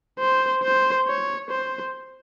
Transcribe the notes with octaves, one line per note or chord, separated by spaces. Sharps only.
C5
C5
C#5
C5